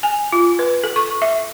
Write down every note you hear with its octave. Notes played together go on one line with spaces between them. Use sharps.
G#5
F4
B4
A4
C#6
E5